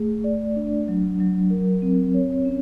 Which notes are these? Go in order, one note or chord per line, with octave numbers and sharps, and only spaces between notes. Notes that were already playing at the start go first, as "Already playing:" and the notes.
Already playing: A3 G#4
D5
D4
F#3
F#3
A#4
C4
C#5
C#4